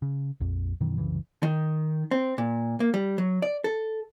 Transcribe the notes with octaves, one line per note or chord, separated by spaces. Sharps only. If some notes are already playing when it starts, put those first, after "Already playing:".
C#3
A#1 F2
F#2 B2 D#3 E3
C2 F#2 C#3 E3
D#3
C4
A#2
A#3
G3
F#3
D5
A4